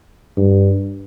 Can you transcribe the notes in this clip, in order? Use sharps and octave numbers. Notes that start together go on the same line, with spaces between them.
G2